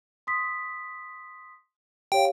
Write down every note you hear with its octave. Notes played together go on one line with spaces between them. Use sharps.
C6 D#6 B6
G4 C#5 F5 G5